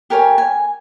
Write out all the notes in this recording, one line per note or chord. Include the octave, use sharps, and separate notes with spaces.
G4 A#4 C#5 G#5
G#5